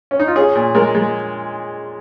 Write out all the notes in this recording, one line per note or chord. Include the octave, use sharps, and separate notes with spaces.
C#4
D#4
F4
C#4 G#4
A#2
G#3 A#4
G#3